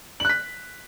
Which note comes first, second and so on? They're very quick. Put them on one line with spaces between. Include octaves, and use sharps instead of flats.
F#7 F#6 B6